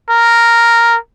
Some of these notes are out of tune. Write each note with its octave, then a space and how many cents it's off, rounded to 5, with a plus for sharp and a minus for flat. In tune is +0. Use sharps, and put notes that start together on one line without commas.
A#4 -5